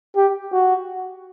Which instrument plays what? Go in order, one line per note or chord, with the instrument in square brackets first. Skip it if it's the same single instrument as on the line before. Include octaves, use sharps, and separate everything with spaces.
[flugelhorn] G4
F#4